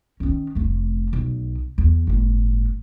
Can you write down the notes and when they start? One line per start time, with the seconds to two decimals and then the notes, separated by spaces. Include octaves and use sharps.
0.20 D#3 C#4
0.55 F1 A3
1.13 B1
1.78 E2
2.07 G1 A2